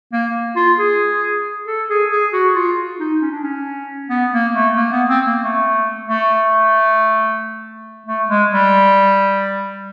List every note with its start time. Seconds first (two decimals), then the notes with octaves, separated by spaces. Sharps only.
0.13 A#3
0.56 F4
0.78 G#4
1.67 A4
1.90 G#4
2.11 G#4
2.33 F#4
2.56 F4
3.00 D#4
3.22 C#4
3.32 D4
3.43 C#4
4.10 B3
4.32 A#3
4.54 A3
4.76 A#3
4.92 B3
5.09 C4
5.26 A#3
5.43 A3
6.08 A3
8.07 A3
8.29 G#3
8.51 G3